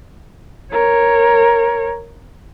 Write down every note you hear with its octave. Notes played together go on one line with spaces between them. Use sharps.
A#4 C#5